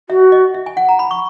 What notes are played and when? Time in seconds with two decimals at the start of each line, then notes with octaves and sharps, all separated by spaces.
0.09 F#4 E5
0.32 D#5
0.54 E5
0.66 G#5
0.77 F#5
0.89 A#5
0.99 B5
1.11 C#6